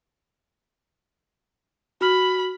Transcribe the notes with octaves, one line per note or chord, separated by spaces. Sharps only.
F#4 B5 F6